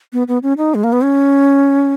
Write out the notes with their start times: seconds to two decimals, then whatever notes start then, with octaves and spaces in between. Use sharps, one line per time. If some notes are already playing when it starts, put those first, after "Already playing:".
0.13 B3
0.28 B3
0.43 C#4
0.58 D#4
0.75 G#3
0.84 A#3
0.93 B3
1.02 C#4